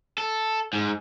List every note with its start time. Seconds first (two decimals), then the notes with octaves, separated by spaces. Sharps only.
0.18 A4
0.73 G#2